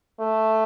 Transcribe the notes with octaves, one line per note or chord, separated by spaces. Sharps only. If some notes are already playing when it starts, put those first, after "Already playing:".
A3